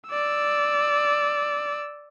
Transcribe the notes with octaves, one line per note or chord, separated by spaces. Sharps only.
D5 E6